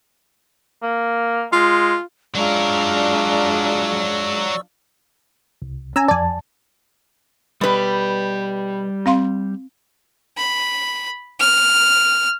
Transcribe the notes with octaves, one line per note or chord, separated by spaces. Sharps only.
A#3
G#3 F4
F#3 G#3 D4 F4 A#4 D5 C#6 E6
C2
C#4 G#5 A#5 E6
F2 D5 G#5 A5
B2 G3 G4 B4
C4 F5 C6
B5
F6